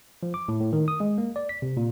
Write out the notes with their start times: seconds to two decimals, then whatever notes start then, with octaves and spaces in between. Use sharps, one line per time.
0.23 F3
0.34 D6
0.48 A2
0.60 A2
0.73 D#3
0.88 D#6
1.00 G#3
1.18 A#3
1.36 D5
1.49 B6
1.62 C3
1.77 A#2